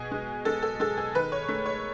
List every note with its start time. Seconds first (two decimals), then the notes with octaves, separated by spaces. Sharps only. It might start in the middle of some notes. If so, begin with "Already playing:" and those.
Already playing: B2 G#4
0.11 G#3
0.45 G#3 A4
0.62 A4
0.80 G#3 A4
0.97 G#4
1.15 D#3 B4
1.32 C#5
1.48 A3
1.66 C#5